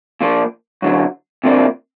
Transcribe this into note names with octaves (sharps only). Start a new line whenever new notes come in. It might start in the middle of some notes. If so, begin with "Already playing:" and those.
A#2 F3 A#3
F#2 D3 F#3
C3 F3 A#3 D4